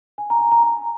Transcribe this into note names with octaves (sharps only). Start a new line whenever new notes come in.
G#5
A#5
G#5
A#5
A#5